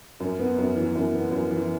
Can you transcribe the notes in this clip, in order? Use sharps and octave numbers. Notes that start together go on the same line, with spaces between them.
F#2
B3
F#2
E3
F#2
B3
F#2
E3